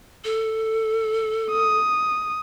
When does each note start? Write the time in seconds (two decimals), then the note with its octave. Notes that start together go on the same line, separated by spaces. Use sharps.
0.24 A4
1.51 D#6